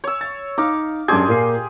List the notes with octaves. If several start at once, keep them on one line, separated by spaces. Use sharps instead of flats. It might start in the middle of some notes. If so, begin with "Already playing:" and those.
C#5 E6
A6
D#4 F5 D6
F#2 D4 G4 G#4 C6 G#6
A#2 A#3 C7